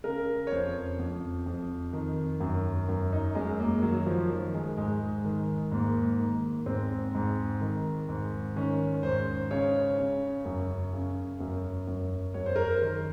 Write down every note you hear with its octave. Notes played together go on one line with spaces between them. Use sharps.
C#3 A#4
C#5
F2 C5
F2
F2
D#3
F#2
F#2
D#4
F#2 G#3
A#3
D#3 F#3
F3
D#3
G#3
G#2 G#3
D#3
G#2 A#3
D#3
G#2 C4
G#2
D#3
G#2
D#3 C#4
G#2 C5
C#3 C#5
C#3
F#2
C#3
F#2
F#2
F#2 C#5
C5
A#4
C5
D#3